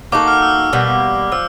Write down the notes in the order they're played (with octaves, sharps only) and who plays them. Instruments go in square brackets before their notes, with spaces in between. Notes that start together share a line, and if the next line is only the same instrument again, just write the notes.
[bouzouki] A#3 D#4 F#4 A4 [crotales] D6
[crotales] F6
E6
[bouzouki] B2 G3 A#3
[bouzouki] F3 [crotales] E6